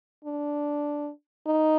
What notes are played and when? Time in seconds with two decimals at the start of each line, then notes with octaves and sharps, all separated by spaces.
0.25 D4
1.46 D#4